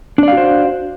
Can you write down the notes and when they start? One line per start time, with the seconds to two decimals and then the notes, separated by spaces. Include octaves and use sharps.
0.18 D4
0.23 D5
0.28 F5
0.33 F#4
0.37 C5